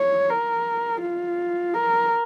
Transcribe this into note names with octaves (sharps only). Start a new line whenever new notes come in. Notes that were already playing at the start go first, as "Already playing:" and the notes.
Already playing: C#5
A#4
F4
A#4